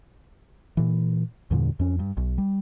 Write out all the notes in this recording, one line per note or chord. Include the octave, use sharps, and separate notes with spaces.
A#2 E3
E2 G2 A#2 D3
F2 C#4
G2
B1
G3